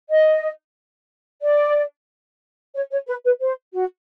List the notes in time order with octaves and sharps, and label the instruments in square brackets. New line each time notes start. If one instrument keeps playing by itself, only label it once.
[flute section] D#5
D5
C#5
C#5
B4
B4
C5
F#4